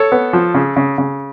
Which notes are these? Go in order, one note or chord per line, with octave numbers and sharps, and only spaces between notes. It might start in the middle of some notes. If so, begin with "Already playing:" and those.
Already playing: A4 C#5
B3
F3
C#3
C#3
C#3